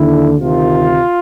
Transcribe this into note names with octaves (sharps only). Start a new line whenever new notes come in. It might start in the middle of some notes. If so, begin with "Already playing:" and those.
Already playing: D#2 D3 E4
D2 C3 D#3 F4